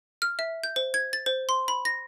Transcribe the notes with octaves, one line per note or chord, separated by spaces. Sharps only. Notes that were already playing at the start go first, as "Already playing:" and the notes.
F6
E5
G6
C5
G#6
A6
C5
C6
B5
A#6